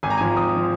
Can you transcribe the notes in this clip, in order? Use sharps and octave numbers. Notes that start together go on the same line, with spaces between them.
G#1 G#5
A#5
G#2 F3 G#5
G#1 D#6
F3